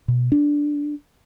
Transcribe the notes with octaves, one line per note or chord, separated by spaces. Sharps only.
B2
D4